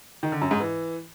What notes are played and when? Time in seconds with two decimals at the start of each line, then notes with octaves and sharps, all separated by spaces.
0.23 D#3
0.32 D3
0.42 F#2
0.51 G#2
0.60 E3